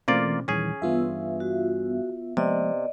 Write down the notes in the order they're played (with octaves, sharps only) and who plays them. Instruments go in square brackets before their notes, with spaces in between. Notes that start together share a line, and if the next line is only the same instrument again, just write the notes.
[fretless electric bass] B2 C#4 [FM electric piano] E3 A3 C4 [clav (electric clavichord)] A#3 F4 D5
[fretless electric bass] D#1 A#2 G3 [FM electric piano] D#3 E3 [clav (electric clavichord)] C#4 G#4
[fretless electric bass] G2 E3 [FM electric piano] B3 F4 E5
[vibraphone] F#4
[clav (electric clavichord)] C3 [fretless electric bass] F3 G#3 A#3 [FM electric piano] B3 [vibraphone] D5 D#5